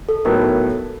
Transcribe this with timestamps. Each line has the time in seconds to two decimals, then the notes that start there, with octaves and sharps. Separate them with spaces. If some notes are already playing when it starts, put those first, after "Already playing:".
0.09 A4
0.25 A2 F#3 B3 D#4 A#4
0.42 A4